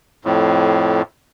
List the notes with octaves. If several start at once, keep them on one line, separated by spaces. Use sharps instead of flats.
F2 A2